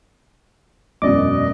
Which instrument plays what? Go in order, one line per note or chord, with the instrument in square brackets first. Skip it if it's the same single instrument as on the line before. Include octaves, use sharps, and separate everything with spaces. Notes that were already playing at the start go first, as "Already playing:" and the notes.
[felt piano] E1 F#2 B2 [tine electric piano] D5 D6 [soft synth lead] D#5